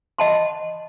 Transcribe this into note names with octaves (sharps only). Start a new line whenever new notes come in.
D#5 F#5 A5 B5 C6